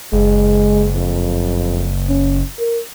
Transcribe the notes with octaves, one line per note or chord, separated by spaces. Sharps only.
F#1 G#3
F2
C#4
A#4